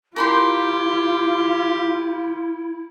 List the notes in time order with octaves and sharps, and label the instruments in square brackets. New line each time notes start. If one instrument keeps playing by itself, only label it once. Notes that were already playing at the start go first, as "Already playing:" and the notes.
[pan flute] E4 [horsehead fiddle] F4 [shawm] G4 [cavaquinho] A#4 B5 C6